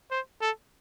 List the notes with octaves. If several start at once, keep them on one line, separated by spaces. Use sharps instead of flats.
C5
A4